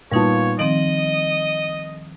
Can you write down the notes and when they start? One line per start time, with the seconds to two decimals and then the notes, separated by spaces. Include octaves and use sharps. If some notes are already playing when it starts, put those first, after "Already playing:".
0.12 A#2 G3 B3 D#4 F4 C#5 A5
0.59 D#3 F3 C4 D#5 D7 F#7